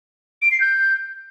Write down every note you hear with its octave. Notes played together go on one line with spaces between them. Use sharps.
D7
C7
G6